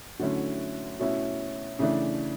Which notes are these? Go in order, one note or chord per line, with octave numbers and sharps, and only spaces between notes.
D3 F#3 A3 C#4 E4
B2 A3 C#4 E4
C#3 E3 A3 D4